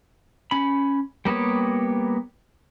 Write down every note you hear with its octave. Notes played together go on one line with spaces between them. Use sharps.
C#4 B5
G3 A#3 B3 G4 C#5